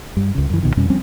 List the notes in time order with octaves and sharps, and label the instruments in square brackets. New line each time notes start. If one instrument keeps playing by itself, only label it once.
[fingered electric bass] G2 G3
C#2 C#3
F#2 E3
C#2 B2 D#3
F2 B2 G3 C#4
F3 G3 C4 C#4